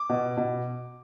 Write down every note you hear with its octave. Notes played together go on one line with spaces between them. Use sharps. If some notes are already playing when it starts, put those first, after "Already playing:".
Already playing: D6
B2
B2